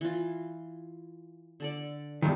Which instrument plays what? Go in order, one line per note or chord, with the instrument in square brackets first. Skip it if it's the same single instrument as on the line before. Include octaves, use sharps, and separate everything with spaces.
[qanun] E3 F4
D3 A4 D5
[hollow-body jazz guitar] E2 G2 D#3 [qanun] F4